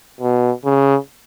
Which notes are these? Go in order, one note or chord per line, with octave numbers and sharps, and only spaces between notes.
B2
C#3